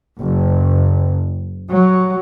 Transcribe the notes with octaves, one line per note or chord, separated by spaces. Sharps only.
F#1
F#3